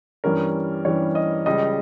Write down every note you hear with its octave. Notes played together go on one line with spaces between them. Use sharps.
G2 E3 G3 C#4 A#4
G2 E3 G3 C#4 C#5
D#5
C#2 C#3 G3 D#5